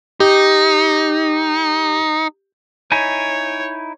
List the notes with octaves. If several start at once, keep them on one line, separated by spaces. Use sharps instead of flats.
D#4 G4
D#4 E4 C#5 G#5